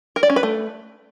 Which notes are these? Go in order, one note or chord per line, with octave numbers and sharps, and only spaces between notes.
A#4
D5
C#4
B4
A3